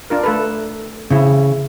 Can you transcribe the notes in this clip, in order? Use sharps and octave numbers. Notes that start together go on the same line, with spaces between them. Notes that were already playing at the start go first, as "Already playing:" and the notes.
D4 F4 A#4
A3 A4 B4
C#3 C4 E4